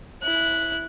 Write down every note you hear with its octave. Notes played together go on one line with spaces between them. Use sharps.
E4 F#6